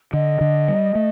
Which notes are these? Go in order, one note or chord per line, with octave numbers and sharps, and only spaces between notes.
D3 D#5
D3
G3
A3